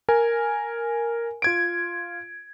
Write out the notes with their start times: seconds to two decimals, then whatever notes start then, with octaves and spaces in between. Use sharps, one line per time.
0.09 A#4 G#5
1.42 F4 G#6 D7